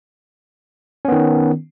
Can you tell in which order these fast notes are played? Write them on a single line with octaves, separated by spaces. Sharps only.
C#4 B3 D#3